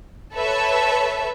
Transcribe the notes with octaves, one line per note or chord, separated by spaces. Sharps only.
A4 B4 C#5 E5